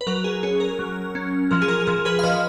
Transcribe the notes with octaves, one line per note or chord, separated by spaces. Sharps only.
B4
F#3 A#4
G#4
C#4 G#4
A#4
F#3
C#4
F3 A#4
G#4
A#4
G#4
F3 A#4
G#4 B4
F5
F3 B4 D#5